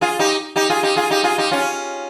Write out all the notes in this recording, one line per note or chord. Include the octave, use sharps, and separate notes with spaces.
F4 G#4
D#4 G4
D#4 G4
F4 G#4
D#4 G4
F4 G#4
D#4 G4
F4 G#4
D#4 G4
C#4 F4